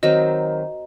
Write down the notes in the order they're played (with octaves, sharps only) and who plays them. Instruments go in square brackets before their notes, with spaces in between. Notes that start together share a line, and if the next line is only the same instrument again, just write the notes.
[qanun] D#3 F#3 C4 D#4 [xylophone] D#5